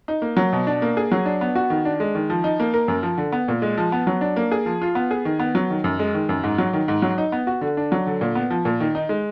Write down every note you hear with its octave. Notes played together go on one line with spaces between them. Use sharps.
D#4
A#3
F#3
B2
D4
A#3
G#4
F#3
D4
B3
F#4
D#3
D4
G#3
D#3
F3
D#4
A#3
A#4
F#2
F3
D3
B3
A#2
G#3
F3
B3
F#3
D4
A#3
G#4
F3
F4
B3
G#4
D#3
B3
F#3
D#3
F#2
G#3
D#3
F#2
G#2
F#3
D#3
G#2
F#3
D#4
B3
F#4
D3
D4
F#3
D3
A#2
B3
F3
A#2
D#3
D#4
G#3